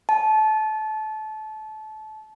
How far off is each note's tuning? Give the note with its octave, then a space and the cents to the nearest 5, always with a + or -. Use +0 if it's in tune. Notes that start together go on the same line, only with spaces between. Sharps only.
A5 -25